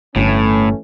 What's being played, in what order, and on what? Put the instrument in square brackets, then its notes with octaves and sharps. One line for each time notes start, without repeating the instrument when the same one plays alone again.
[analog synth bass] G1 [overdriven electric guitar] A2 [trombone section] E3 A3 C#4